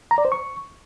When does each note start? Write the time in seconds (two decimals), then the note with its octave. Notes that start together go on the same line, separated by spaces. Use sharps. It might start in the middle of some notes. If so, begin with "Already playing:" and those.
0.11 A#5
0.18 D5
0.25 C5
0.32 C#6